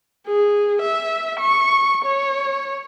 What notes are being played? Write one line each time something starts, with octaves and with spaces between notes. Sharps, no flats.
G#4
E5
C#6
C#5